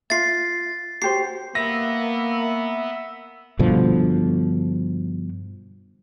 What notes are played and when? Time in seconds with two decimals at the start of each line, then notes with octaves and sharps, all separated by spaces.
0.10 F4 E5 A6 C7
1.02 F#4 G4 C5 C7
1.55 A#3 B3 E5 A#6
3.59 G2 B2 D3 F3